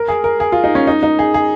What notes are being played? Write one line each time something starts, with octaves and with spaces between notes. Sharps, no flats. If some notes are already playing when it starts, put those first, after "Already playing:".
Already playing: A#4
G#4
A#4
G#4
F4
D#4
C#4
D#4
D#4
G#4
G#4